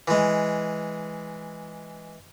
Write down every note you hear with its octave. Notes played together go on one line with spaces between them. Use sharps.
E3 G#3